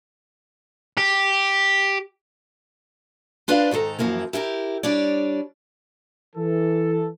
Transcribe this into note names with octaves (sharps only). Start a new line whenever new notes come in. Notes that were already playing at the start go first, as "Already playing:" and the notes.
G4
D4 F4 B4 C5 D5 F5
G#2 D#3 G#4 A4 A#5
F#2 E3 F3 A#3 E4
E4 G4 A4 A#4
G3 D4 C#5 D5
E3 A4